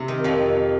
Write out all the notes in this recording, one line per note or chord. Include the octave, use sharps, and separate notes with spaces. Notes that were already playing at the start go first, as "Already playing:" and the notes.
Already playing: C3
D#3
F2 F3